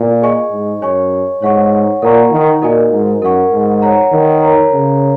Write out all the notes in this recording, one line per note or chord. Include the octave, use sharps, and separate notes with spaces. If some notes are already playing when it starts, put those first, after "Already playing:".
Already playing: A#2
G#4 D#5 G#5 C#6
G#2
F#2 C#5 G#5 C#6
G#2 C#5 F#5 C#6
A#2 A#4 F#5 A#5 C#6
D#3
A#2 D#4 F#4 A#4 D#5 G#5
G#2
F#2 A#4 F#5 C#6
G#2
C#5 F#5 A#5
D#3
A#4 C#5 A#5
C#3